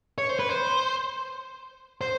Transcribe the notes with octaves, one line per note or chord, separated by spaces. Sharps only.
C#5
C5
B4
C5
C5